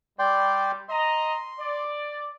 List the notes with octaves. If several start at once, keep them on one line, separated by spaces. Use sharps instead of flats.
G3 D5 G5 C6
D#5 A#5 C6
D5